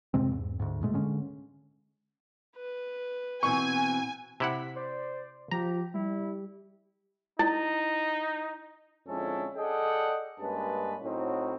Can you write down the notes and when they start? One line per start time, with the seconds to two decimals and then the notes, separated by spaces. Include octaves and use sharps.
0.14 F2 C3 G#3 C4
0.31 E2 G#2
0.60 D2 G#2
0.81 G#2 B2 G#3 A3
0.93 D3 G#3 C#4
2.56 B4
3.43 B2 E3 C4 G#5 C#6
4.40 C3 E4 F#5 B6
4.76 C5 D5
5.51 F3 G4 A#5
5.94 G3 E4
7.39 D#4 E4
9.07 F2 D3 G#3 C#4 E4 A4
9.57 G#4 A4 D5 D#5 F#5 G5
10.40 G2 G#3 A#3 C#4 B4 A5
11.02 A2 F#3 C4 D#4 F#4